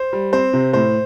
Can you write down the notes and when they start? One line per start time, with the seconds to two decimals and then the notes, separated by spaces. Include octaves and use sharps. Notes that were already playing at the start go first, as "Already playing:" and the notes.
Already playing: C5
0.13 G3
0.33 C4 C5
0.53 C3
0.73 A2 C5